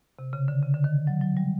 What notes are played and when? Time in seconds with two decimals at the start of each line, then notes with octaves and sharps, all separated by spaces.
0.19 C3
0.33 C#3
0.48 D3
0.63 C#3
0.74 D3
0.84 D#3
1.07 F#3
1.21 F#3
1.37 G3